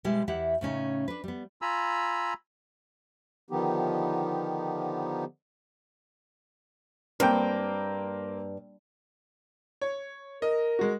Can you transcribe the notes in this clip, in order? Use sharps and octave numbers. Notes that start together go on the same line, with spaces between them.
B2 G3 G#3 E4
E2 E4 G4 E5 F#5
A2 C#3 C#4 D#4
D4 B4
G3 B3
F4 G#5 A#5 B5 E6
D3 D#3 F3 B3 D#4 G4
G2 A#3 C4 G5
C#5
A#4 D#5
G#3 F#4